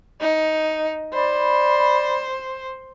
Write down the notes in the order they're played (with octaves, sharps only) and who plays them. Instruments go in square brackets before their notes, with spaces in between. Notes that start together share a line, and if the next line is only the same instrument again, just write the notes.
[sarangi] D#4
[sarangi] C5 [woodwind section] D5 B5